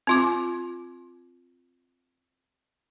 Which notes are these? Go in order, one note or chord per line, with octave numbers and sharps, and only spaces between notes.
C4 F4 D6